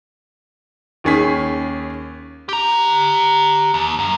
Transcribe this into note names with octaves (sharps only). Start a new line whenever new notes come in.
D#2 D#3 C#4 G#4 B6
G4 A#5
D#2
F#2